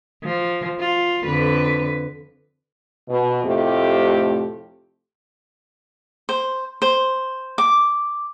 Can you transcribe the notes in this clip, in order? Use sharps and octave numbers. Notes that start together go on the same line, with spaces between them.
F3
F4
F2 D3 B4
B2
F2 A2 C3 A3 G4
C5
C5
D6